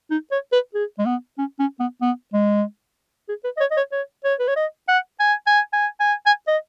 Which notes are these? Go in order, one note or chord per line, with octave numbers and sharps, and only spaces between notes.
D#4
C#5
B4
G#4
G#3
B3
C#4
C#4
B3
B3
G#3
G#4
B4
D#5
C#5
D#5
C#5
C#5
C#5
B4
C#5
D#5
F#5
G#5
G#5
G#5
G#5
G#5
D#5